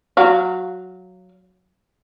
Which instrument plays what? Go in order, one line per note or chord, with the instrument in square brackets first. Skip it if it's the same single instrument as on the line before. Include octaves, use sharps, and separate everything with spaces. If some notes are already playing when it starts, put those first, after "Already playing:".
[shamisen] F#3 F5